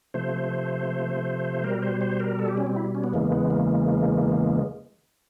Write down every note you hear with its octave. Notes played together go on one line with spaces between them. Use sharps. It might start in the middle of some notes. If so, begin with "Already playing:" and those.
C3 F3 A3 C5
B2 G3 A#4
C5
C5
A#4
A4
G4
C#4
C4
E4
C#4
B3
E2 C#3 E3 G#3 A#3
B3
A#3